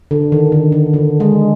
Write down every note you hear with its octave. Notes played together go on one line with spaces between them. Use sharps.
D3
D#3
D3
D3
D3
G#3